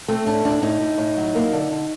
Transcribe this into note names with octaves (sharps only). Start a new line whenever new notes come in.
A3 C4
A2 D4
A2 D4
A2 D#4
A2
A2
F#3
A#3
D3
D3